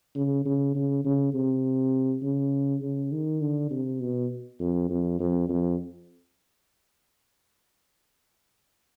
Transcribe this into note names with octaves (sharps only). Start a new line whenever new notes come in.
C#3
C#3
C#3
C#3
C3
C#3
C#3
D#3
D3
C3
B2
F2
F2
F2
F2